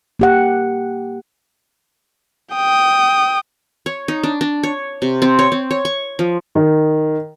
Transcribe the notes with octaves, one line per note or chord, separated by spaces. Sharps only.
A#3 G4 F#5
G5 D#6
C#5
D#4
D4
D4
C#5
C3
C4
C#5
C4
C#5
C#6
F3
D#3